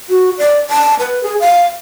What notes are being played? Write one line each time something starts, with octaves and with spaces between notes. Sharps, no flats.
F#4
D5
A5
B4
G#4
F5